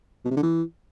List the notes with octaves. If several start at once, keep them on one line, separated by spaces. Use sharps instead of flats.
B2
C3
D3
E3